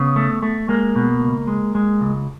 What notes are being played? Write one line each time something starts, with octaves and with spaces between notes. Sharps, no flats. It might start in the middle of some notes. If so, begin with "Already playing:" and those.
Already playing: C#3 B3
A3
A3
G#3 A#3
B2
C#2
G#3
G#3
C#2